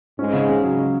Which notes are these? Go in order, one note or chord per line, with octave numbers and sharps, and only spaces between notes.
G#2 G#3 C#4
C#3
C#3
F#3
C#4